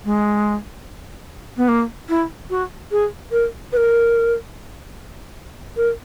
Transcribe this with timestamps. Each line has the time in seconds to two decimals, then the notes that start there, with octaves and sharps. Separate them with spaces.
0.05 G#3
1.57 B3
1.68 A#3
2.09 E4
2.50 F#4
2.91 G#4
3.31 A#4
3.72 B4
3.77 A#4
5.76 A#4